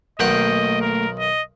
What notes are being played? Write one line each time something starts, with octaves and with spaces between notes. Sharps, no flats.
B1 D#3 A3 A#3 D#5 F#5 G5
A#4
D#5